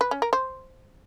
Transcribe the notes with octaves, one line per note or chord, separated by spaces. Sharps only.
B4
C#4
A#4
C5